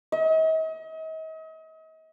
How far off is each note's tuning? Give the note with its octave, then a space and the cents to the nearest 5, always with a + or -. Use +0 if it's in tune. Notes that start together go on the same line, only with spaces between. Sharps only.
D#5 +40